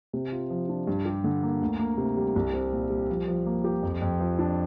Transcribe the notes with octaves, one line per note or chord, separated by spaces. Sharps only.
C3
F4
F3
D4
G2
G4
D3
A#3
D2
A#3
C3
G3
C2
C4
A#2
G3
F3
F3
A#3
G4
F2
F2
F3
D4